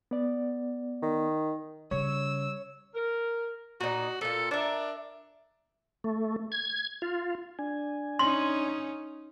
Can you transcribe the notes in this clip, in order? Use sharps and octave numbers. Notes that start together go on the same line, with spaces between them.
B3 D5
D#3
C#3 G3 C#5 E6
A#4
A#2 D#4 F#4
A#2 F4 A4
D4 A#4 E5
A3
G#6
F4
D4 G#5
C#4 D#4 C6